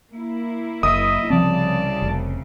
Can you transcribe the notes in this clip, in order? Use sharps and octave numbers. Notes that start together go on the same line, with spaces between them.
A#3 E4
F#1 D#5 E5 D#6
C2 C#3 F3 C4 D5 A5
F1